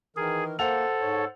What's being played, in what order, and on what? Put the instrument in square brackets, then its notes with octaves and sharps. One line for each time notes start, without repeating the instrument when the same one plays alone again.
[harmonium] D#3 E3 A#4 [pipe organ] G#4
[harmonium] A#3 [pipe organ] A4 [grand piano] C5 F#5 F7
[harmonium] G#2 C#5